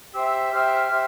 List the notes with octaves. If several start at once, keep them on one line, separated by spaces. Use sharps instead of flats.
G4 C5 E5 E6
G4 C5 E5 F6
G4 C5 E5